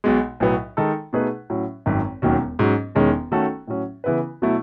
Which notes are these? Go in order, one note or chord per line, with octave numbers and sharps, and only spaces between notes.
B1 B2 G#3
B1 A2 F#3 B3
D#3 G#3 D#4 A4
B2 A3 D#4 G#4 B4
A2 F#3 C#4
G#1 F#2 D#3
E1 D#2 D#3 F#3 C#4
G#2 F#3 C#4
E1 E2 D#3 G#3 C#4
D#3 A3 C#4 F#4 A4
A2 F#3 C#4
C#3 E3 B3 E4 B4
B2 F#3 A3 E4